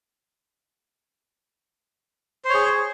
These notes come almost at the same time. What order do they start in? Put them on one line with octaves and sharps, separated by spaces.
C5 C#5 G#4